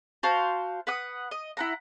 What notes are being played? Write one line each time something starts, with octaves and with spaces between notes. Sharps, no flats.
F#4 C5 F5 A5
B4 F#5 D#6
D#5
E4 F#5 A#5